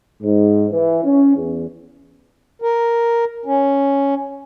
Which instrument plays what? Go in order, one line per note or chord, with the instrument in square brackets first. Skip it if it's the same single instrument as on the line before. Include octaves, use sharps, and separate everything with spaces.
[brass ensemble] G#2
E3
C#4
E2
[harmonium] A#4
C#4